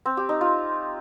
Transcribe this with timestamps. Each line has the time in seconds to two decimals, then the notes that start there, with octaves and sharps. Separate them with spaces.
0.06 C4
0.17 G4
0.29 D#4
0.41 F4